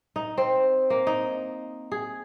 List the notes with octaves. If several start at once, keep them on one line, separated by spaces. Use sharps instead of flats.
D#4
C4
A#3
D#4
G#4